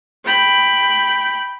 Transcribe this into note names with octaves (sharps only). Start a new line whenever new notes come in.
G5 B5